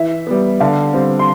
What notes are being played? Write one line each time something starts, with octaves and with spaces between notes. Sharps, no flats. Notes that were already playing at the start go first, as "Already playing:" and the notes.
Already playing: E3 E5
G3 B3
D3 F5
G3 C4
C6